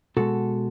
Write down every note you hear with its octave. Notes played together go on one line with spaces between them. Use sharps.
B2 G#3 F#4 A4